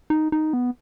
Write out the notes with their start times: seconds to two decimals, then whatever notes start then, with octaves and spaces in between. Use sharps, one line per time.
0.10 D#4
0.32 D#4
0.53 B3